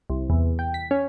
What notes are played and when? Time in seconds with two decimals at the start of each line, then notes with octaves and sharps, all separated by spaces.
0.10 C2
0.30 E2
0.59 G5
0.74 B6
0.91 C#4